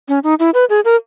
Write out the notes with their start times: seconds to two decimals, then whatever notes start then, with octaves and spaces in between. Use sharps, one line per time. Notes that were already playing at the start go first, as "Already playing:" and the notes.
0.09 C#4
0.24 D#4
0.40 E4
0.54 B4
0.70 G#4
0.85 A#4